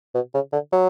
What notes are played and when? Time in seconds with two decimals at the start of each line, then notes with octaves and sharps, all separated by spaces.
0.14 B2
0.34 C#3
0.52 D3
0.72 F#3